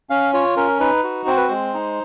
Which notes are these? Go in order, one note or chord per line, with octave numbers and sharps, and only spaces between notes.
C#4 F5
F4 C#5
C#4 A#4
D#4 B4
F#4
C4 C5
B4
G#3 C5
D#4